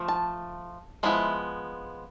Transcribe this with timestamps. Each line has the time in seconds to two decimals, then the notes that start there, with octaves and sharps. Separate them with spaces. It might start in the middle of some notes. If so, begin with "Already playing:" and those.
Already playing: F3 A3
0.08 A5
1.03 F3 G#3 B3 E4